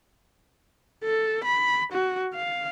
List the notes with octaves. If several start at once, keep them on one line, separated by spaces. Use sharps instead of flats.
A4
B5
F#4
F5